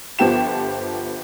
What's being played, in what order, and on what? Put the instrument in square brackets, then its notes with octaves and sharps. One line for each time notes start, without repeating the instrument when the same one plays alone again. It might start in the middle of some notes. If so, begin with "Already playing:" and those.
[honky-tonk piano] G1 F3 B3 G4 E7